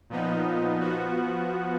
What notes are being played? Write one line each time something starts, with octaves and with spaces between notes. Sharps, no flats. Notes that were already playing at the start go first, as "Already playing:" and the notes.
A#2 F3 B3 D#4
F3 B3 F#4